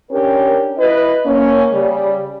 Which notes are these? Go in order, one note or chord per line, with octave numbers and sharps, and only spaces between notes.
C#4 D4 G4 A#4
E4 B4 D#5
A#3 C#4
C#3 G3